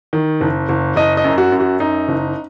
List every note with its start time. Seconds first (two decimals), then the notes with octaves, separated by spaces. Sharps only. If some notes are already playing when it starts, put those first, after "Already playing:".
0.13 D#3
0.41 F#1
0.69 F#1
0.96 F#1 D#5
1.17 D#5
1.24 F#2
1.38 F#4
1.52 F#2
1.60 F#4
1.80 F#2 D#4
2.08 F#1